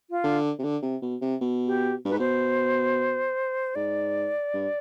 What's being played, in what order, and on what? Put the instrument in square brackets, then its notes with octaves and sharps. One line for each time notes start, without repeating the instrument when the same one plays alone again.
[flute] F4
[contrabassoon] D3
C3
D3
C3
B2
C3
B2
[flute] G4
[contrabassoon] G2
[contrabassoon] G#2 [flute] B4
[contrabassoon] B2 [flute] C5
[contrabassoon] G#2 [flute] D5
[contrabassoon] G2